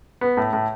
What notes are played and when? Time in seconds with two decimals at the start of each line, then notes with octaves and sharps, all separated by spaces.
0.21 B3
0.37 A2
0.53 A2